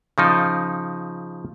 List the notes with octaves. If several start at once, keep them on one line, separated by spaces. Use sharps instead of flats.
C#3 F3 D#4